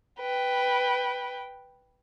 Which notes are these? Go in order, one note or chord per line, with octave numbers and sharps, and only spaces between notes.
B4 G5